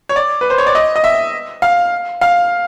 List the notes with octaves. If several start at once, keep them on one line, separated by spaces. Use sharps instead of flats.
C#5
D5
B4
C5
C#5
D5
D#5
D#5
E5
F5
F5